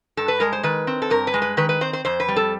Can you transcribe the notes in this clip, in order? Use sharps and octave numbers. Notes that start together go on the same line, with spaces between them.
G2 A4
B4
G#3 A#4
C5
D#3 B4
C4
A4
G2 A#4
B4
G#3
B4
D#3 B4
B4
C4 C5
C5
F2 C5
B4
G3
A4